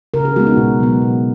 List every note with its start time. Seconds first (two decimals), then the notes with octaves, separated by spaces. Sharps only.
0.14 C#3 A#4
0.25 G#4
0.36 G#3 B3 F#4
0.47 D#4
0.57 B2
0.80 F#3 B3
1.02 B2